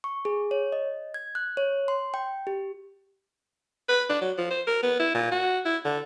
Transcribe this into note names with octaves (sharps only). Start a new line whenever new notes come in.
C#6
G#4
C#5
D#5
G#6
F#6
C#5
C6
G5
G4
B4
D4
F#3
F3
C5
A#4
B3
E4
A#2
F#4
E4
D3